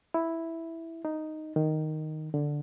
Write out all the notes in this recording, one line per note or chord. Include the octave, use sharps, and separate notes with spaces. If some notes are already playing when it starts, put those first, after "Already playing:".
E4
D#4
D#3
D3